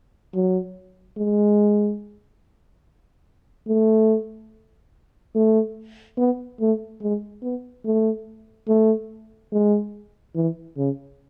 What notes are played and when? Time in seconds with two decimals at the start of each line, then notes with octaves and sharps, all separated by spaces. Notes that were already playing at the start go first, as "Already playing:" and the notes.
0.34 F#3
1.17 G#3
3.67 A3
5.35 A3
6.18 B3
6.60 A3
7.02 G#3
7.42 B3
7.85 A3
8.68 A3
9.52 G#3
10.35 E3
10.77 C#3